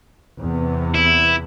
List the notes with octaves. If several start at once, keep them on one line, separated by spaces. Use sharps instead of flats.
E2 C3 B3
E4